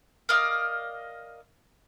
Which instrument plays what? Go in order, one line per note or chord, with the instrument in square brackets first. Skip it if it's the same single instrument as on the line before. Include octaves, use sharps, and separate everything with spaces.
[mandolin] A#4 D5 D#5 F5